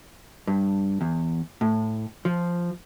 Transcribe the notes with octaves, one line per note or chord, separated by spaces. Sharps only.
G2
E2
A2
F3